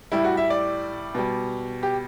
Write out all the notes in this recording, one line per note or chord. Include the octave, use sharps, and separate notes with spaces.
A2 G3 E4
F#4
E5
D5
B2 G3
G4